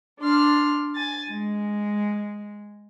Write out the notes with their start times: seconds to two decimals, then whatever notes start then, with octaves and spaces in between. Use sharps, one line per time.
0.20 D4 C6 F6
0.94 G#5 A6
1.30 G#3